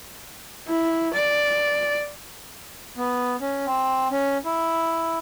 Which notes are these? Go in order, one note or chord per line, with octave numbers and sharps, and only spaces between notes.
E4
D5
B3
C#4
C4
C#4
E4